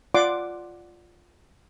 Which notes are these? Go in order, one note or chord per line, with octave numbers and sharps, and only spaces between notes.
F4 D5 F#5 C6 D6